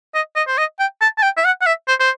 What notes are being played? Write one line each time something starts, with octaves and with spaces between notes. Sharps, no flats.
D#5
D#5
C5
D#5
G5
A5
A5
G5
E5
F#5
F#5
E5
C5
C5